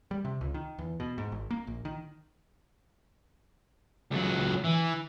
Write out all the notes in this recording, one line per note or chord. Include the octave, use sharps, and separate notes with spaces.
G3
C3
C#2
D#3
E2
B2
G#2
G#1
A#3
A#1
D#3
C#2 F#3
E3